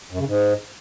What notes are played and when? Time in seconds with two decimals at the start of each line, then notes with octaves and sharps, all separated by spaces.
0.11 F#2
0.19 C#3
0.27 G#2